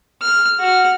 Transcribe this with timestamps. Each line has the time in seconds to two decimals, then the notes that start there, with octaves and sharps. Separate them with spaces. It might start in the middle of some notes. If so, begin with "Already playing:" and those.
0.22 F6
0.60 F#4 F6